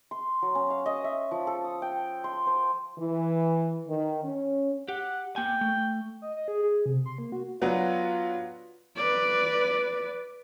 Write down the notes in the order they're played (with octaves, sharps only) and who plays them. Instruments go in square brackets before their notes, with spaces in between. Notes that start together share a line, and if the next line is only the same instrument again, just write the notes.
[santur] C6
F#3
C#4
F5
D#5
E5
F3
A4
D#6
G5
C6
C5
[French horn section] E3
D#3
C#4
[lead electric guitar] G4 [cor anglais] F#5
[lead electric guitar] A#3 G#5 [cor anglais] G5
[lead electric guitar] A3
[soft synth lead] D#5
D#5
G#4
G#4
C3
C6
A#3
F#4
[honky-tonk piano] F#3 B3 D4 [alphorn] F4
[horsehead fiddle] B4 D5